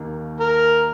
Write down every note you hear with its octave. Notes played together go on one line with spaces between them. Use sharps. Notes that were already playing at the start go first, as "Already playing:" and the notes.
Already playing: D#2 D#3 A#3
A#4